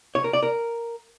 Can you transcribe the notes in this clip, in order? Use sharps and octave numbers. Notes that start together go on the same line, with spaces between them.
C#5
A#4
D5
A#4